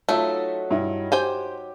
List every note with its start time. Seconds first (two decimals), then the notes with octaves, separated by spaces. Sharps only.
0.09 F#3 A3 D#4 F4 E5 A5
0.70 G2 E4
1.12 G4 C5 G5 G#5